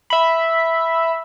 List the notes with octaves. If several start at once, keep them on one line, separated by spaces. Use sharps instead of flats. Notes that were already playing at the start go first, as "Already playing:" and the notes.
E5 B5